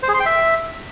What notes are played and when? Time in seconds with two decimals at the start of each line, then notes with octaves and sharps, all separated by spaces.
0.03 C5
0.08 G#4
0.14 C6
0.20 G5
0.26 E5